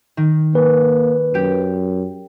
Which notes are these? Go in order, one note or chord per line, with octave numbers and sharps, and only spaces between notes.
D#3
A#3 B4
F#2 G4 D7